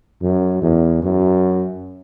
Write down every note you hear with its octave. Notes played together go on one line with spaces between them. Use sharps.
F#2
E2
F#2